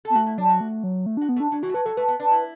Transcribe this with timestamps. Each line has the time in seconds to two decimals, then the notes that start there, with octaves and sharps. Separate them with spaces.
0.05 A4
0.10 B3
0.15 A3 F#4
0.26 E4
0.38 F#3 D4
0.50 F#4
0.61 A3
0.84 F#3
1.06 A3
1.17 D4 F#4
1.29 B3
1.36 A3
1.40 D4
1.51 F#3 D4
1.63 E3 F#4
1.69 A3
1.74 F#3 B4
1.86 F#3 A4
1.97 A3 B4
2.08 B3
2.20 D4 B4
2.31 E4